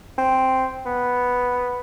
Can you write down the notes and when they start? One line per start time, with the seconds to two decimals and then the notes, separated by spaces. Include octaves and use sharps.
0.18 C4
0.86 B3